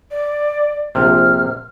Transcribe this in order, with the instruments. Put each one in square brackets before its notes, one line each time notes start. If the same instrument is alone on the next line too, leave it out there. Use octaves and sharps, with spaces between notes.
[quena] D5
[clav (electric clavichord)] A#1 C3 [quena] F6